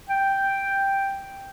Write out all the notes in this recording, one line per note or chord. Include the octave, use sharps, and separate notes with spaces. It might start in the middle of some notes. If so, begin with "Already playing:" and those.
G5